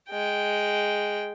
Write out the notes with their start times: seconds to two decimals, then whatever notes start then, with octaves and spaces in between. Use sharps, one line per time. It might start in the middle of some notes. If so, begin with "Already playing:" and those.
0.10 G#3 G5